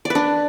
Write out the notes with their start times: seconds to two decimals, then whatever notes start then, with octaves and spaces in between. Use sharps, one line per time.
0.05 D5
0.10 B4
0.15 D4